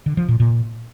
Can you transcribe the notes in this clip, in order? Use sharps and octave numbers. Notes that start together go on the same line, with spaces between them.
D3
F3
A#2
A#2